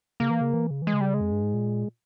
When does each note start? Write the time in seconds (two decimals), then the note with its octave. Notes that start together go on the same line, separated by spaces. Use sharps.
0.20 C#3 A#3
0.30 E3
0.41 C#3
0.53 E3
0.71 C#3
0.82 E3
0.87 G#3
0.93 C#3
1.01 G3
1.14 G#3
1.20 F2
1.32 G2
1.43 G#2
1.54 A#2